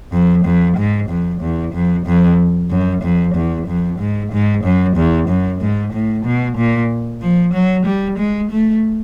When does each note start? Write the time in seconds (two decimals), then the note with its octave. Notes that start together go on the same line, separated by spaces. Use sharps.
0.12 F2
0.45 F2
0.77 G#2
1.09 F2
1.41 E2
1.74 F2
2.06 F2
2.70 F#2
3.03 F2
3.35 E2
3.67 F2
4.00 G#2
4.32 G#2
4.64 F#2
4.96 E2
5.28 F#2
5.61 G#2
5.93 A2
6.25 B2
6.57 A#2
7.22 F3
7.54 F#3
7.86 G3
8.18 G#3
8.51 A3